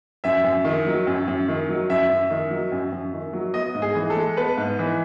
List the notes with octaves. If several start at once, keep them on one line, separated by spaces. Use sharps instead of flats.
F#2 E5
F#2
D#3
F#3
F#2
F#2
D#3
F#3
F#2 E5
F#2
D#3
F#3
F#2
F#2
D#3
F#3
B3 D#5
G#2
G#4
E3
A4
G#3
B3 B4
G#2
E3